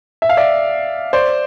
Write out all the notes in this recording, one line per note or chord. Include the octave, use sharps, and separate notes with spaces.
E5
F5
D5 E5
C5 D5